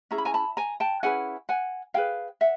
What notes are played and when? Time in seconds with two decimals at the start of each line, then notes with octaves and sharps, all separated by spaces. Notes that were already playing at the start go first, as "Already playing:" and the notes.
0.11 C#4 E4 G#4 A#5
0.18 B5
0.25 G#5 A#5
0.34 A5 B5
0.57 G#5 A#5
0.80 G5 A5
1.03 C#4 E4 G#4 B4 F#5 G#5
1.49 F#5 G#5
1.94 E4 G#4 B4 F5 G5
2.41 E5 F#5